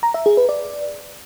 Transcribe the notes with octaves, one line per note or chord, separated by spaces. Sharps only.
A#5
E5
G#4
B4
D5